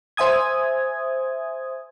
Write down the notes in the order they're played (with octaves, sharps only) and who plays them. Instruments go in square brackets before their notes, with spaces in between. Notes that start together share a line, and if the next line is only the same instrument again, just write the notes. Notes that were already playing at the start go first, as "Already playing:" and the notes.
[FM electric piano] C5 E5 G#5 D#6 G#6